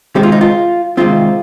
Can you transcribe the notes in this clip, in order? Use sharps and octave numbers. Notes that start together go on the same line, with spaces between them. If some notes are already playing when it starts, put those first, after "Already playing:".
C3 D#3 G#3 C4 G4
F4
D#4
F4
C3 D#3 G#3 C4 F4